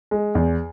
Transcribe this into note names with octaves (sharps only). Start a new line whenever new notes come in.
G#3
E2